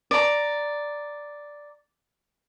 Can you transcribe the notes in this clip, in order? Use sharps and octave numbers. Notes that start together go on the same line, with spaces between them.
D5 A#5